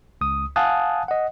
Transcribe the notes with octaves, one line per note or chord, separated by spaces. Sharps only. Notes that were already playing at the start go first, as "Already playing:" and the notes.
C#2 D#6
F5 F#5 G#5 A5 D#6 F#6
D#5 F#5